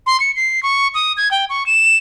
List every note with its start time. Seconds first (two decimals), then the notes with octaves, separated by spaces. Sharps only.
0.07 C6
0.20 C#7
0.36 C7
0.63 C#6
0.94 D#6
1.17 G#6
1.31 G5
1.49 C#6
1.66 E7